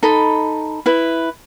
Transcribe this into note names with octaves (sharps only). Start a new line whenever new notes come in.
D#4 A4 B5
E4 B4